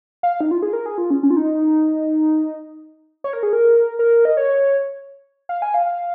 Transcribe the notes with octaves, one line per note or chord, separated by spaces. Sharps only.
F5
D#4
F4
G#4
A#4
G#4
F4
C#4
C#4
F4
D#4
C#5
A#4
G#4
A#4
A#4
D#5
C#5
F5
G#5
F5
F5